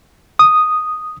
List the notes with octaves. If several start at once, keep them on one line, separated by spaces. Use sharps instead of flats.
D#6